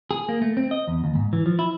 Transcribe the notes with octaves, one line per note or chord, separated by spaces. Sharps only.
G#4
A#3
A3
C4
D#5
E2
D#2
G#2
E3
F3
E4